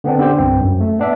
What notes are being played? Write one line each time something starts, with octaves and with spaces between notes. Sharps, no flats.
D3 B3 C4 D4
D3 C#4 G4 A4 C5
C2 G2 C4
F#2
A3
B3 D4 E5